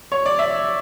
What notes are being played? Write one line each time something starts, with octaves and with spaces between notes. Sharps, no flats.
C#5
D5
E5